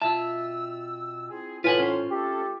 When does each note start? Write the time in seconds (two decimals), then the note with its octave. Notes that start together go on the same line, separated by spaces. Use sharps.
0.02 B2 C4 F4 E5 A5 E6
1.30 C4 E4 G#4
1.64 A2 E3 D#4 F4 B4 F#5 G#5 C6
1.79 C#4 C5
2.11 A3 C4 G4 A4